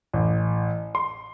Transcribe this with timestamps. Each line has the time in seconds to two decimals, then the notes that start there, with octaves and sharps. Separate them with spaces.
0.13 A1
0.95 C6